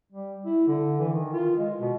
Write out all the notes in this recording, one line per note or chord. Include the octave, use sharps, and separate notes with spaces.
G3
E4
D3
E3
D#3
F4
G#3
B2